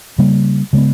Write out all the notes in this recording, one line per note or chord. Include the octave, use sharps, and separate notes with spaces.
C#3 G3 A#3
C#3 G#3 B3